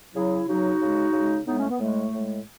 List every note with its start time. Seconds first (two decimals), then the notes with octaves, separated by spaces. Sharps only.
0.13 C#3 F#3 E4 G#4
0.47 C#3 F#3 D#4 F#4
0.80 C#3 G#3
1.13 C#3 G#3
1.46 A2 G#3 B3 D#4
1.58 A3 C#4
1.69 B3
1.80 A2 G#3 A3
2.13 A2 G#3